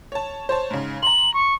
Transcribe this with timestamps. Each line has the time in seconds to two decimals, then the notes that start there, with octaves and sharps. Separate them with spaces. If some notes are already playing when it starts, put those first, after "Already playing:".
0.12 C#5 A5
0.49 C5 C#5 A5
0.71 G#2 C#3
1.03 A#5 C6 F#7
1.34 C#6